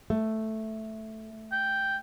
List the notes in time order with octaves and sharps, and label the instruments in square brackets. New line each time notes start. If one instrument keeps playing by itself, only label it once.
[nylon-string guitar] A3
[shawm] G5